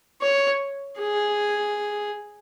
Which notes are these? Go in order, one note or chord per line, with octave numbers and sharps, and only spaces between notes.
C#5
G#4